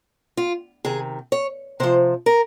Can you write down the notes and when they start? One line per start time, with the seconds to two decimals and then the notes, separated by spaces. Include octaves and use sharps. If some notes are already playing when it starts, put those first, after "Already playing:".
0.37 F4
0.85 C3 D#3 G#4
1.32 C#5
1.80 C3 F3 C5
2.26 A#4